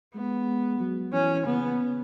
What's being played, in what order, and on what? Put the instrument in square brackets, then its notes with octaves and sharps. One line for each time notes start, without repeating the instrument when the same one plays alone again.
[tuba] G#3 [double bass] B3
[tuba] F#3
[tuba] E3 [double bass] C#4
[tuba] C#3 [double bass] B3